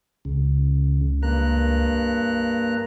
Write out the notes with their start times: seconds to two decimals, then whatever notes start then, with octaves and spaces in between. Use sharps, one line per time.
0.25 C#2 C#3
1.23 G2 A#3 A#5 F#6